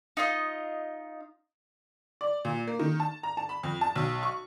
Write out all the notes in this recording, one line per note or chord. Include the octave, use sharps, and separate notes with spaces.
D#4 F4 D#5
D5
A#2
A#3
D#3
A5
A#5
A5
B5
F2
A5
B1
C#6